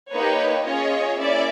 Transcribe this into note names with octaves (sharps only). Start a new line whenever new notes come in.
A#3 D#4 G4 B4 C#5
C#4 F4 G#4 C#5 D#5
A#3 C#4 E4 D5 E5